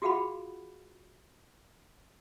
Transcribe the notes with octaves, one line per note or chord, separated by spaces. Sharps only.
F4 F#4 G#4 F5 F#5 B5